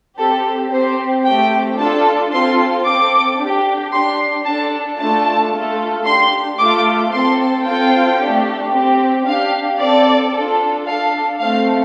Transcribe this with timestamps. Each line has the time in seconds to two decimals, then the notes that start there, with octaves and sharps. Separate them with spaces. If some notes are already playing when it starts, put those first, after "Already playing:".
0.18 C4 G4 A4
0.71 C4 G4 C5
1.25 A3 C4 G4 G5
1.78 D4 F4 A4 A5
2.32 C4 F4 A4 C6
2.85 C4 A4 D6
3.38 D4 G4
3.92 D4 G4 C6
4.45 D4 A4 A5
4.98 A3 D4 F4 A4 A5
5.52 A3 F4 A4
6.05 D4 G4 C6
6.58 A3 F4 A4 D6
7.12 C4 A4 C6
7.65 C4 F4 A4 G5
8.19 A3 D4 G4
8.72 C4 G4
9.26 D4 G4 F5
9.79 C4 A4 D5
10.33 D4 F4 A4
10.86 D4 A4 F5
11.40 A3 C4 A4 F5